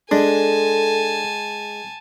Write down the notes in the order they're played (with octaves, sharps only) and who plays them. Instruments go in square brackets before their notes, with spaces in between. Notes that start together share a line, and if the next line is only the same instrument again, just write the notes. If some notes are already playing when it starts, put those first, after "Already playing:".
[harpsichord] G#3 [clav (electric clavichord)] D4 [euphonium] A4 [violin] G#5 A5